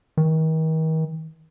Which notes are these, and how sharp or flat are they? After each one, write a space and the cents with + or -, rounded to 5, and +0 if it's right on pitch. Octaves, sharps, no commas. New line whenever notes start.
D#3 +40